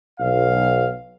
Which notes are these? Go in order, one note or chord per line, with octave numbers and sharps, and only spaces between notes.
B1 F5